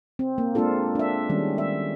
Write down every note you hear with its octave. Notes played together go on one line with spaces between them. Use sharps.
C4
A#3
G#3 A#3 C4 D4 F4 A4
D4 E5
D#3 G3 G#3 C#4
E5